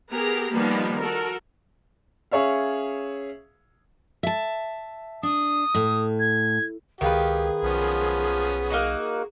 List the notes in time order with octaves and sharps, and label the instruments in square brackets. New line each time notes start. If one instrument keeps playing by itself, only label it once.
[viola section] B3 G4 G#4 A#4 A#5
D#3 F3 G3 A#3 B3 D#4
F#4 A4 A#4
[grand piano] C#4 G#4 C#5 E5 F5
[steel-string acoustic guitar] E5 A5
[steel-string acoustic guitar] D4 [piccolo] D#6
[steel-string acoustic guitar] A2
[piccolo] G#6
[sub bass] C#2 [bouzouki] D#3 F4 B4 [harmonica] G4 [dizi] G#4
[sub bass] B1 [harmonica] F3 B3 C#4
[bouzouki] A#3 D#4 F#4